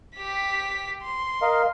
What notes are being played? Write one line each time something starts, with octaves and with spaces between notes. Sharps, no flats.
G4 B6
C6
A#4 D#5 F5